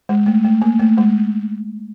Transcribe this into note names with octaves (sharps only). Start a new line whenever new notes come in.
G#3
A3
A3
A#3
A3
G#3